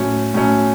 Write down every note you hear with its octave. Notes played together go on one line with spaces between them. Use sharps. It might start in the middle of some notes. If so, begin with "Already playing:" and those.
Already playing: A2 F#3 C#4
A2 F#3 C#4